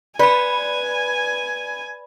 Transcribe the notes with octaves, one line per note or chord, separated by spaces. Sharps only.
B4 D5 G#5 B5